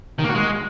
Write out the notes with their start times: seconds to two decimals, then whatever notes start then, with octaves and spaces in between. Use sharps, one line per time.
0.19 D#3
0.24 A#3
0.29 F#4
0.35 G#3